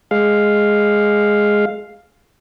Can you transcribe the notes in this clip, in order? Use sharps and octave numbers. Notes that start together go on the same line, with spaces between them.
G#3 F5